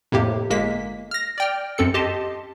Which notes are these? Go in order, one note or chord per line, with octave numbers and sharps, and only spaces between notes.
F2 A2 C3 A#3 G4
G1 G#3 A#3 B6
F6 A#6
D5 G5 F6
F#2 C4 A4 C#7
G4 D#5 A5 C6